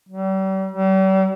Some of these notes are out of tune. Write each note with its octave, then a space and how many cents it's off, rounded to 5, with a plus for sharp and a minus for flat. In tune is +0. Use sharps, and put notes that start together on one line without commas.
G3 -40
G3 -45